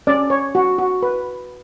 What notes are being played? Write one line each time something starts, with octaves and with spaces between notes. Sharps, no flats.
C#4 D5
C#5
F#4
F#4
B4